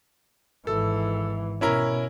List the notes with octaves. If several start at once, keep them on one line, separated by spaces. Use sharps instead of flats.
G#1 E3 A4
B2 C#4 E4 A#4